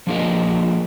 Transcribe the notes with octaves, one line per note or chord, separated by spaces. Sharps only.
F3 A#3 D4 G#4 A#4 D#5